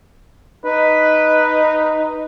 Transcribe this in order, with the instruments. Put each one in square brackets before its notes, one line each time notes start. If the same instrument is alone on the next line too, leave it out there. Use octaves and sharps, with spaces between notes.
[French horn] D#4 [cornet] B4